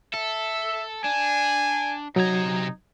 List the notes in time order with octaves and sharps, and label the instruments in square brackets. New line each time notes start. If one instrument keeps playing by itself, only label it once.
[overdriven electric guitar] A4 [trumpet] E5
[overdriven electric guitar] D4 [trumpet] G#5
[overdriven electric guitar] C3 A#5 [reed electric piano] F#3 G#6 [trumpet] D#4